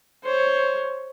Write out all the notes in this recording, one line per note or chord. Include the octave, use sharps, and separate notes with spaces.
C5 C#5